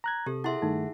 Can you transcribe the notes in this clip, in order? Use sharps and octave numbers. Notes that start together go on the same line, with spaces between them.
A#5 F#6 G#6
C3 G4 A4
E4 G#4 E5 F#5 C6
G2 D#3 A3 D#4